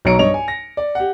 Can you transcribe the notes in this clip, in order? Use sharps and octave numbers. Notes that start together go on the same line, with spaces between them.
B1 F#3 C#5 A#5 C#7 D7
G2 C#5 D#5 F7
G#5
A#6
D5
G4 F#5